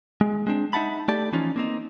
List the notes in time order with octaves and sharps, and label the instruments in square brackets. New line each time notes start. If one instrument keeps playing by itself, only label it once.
[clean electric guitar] G#3
G#3 C4 D4
D#4 E5 F#5 A5 B5
A3 G4 D5 A5
E3 F3 C#4 D#4 F4
A#3 C4 D#4